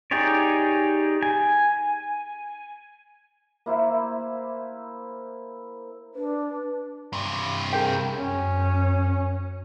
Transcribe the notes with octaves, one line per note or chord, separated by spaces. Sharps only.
D#4 G4 G#4 C#5 D5
G#5
A#3 E4 C5
D4 B4
G2 C3
G#4 A#4 G5
F#2 C#4